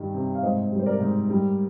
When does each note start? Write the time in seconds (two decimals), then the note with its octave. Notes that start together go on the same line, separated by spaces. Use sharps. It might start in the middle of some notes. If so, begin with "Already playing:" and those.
Already playing: G2 D#3 G3
0.14 C3
0.35 F5
0.43 G#2 C5 D#5
0.72 G3
0.79 C5
0.86 A#4 D5
1.00 G#2
1.30 G3